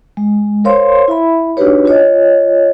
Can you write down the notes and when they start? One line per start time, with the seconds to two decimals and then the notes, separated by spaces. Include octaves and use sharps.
0.17 G#3
0.64 A#4 C5 C#5 F5 C6
1.08 E4 E5 B5
1.57 D4 D#4 F#4 G4 B4 C#5
1.85 F4 C#5 D#5